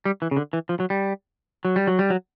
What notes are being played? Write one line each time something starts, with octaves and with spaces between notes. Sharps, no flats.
G3
E3
C#3
D3
E3
F3
F#3
G3
F#3
G3
F#3
G3
F#3